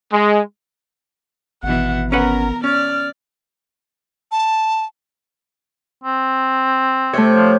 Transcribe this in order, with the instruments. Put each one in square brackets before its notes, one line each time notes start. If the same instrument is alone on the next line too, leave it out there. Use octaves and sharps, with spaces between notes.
[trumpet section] G#3
[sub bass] G#1 [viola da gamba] B2 E3 [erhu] F#5
[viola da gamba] B3 A#4 [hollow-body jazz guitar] C#4 B4 F#5 [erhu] A#5
[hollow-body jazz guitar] C#4 [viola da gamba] D5 [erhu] F6
[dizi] A5
[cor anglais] C4
[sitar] C3 [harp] A3 C#5
[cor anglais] F3